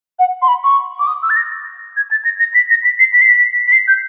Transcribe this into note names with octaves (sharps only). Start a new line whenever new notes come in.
F#5
C6
B5
C#6
D6
D#6
E6
A6
A#6
G#6
A6
A#6
A#6
B6
A#6
B6
C7
B6
C7
B6
B6
C7
G6